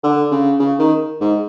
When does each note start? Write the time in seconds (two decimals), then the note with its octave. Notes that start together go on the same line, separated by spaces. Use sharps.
0.03 D3
0.31 C#3
0.59 C#3
0.79 D#3
1.21 G#2